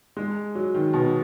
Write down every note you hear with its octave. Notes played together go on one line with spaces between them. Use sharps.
G#3
F#3
D#3
B2